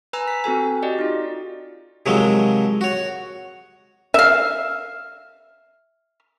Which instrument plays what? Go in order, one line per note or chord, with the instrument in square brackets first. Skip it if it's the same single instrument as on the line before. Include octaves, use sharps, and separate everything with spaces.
[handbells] B4 G#5 A#5 E6
B6
C4 F#4 A4 G#5
F#4 G4 D5 D#5
D#4 F4
[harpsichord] C3 D#3 F3 F#3 G#3 C4
F#4 C#5
[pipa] E5 F5